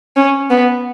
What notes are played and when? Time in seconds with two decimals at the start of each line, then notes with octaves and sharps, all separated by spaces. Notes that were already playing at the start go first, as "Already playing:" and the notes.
0.16 C#4
0.50 B3